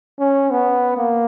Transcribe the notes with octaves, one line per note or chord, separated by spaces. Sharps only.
C#4
B3
A#3